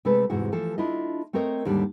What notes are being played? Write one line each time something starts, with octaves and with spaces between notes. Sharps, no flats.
C3 G#3 A3 A4 B4
E2 G#2 C3 E4 F#4
E3 F3 A3 A4
D4 E4 F4 D#5
A3 C4 A4 A#4 C#5 D#5
D#2 G#2 D3 G3 D4